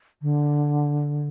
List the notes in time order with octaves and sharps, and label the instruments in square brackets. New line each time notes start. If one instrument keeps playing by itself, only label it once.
[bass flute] D3